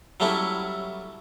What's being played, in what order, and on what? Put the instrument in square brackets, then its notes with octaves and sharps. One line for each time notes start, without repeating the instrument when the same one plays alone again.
[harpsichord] F#3 G3 A3 C#4 E4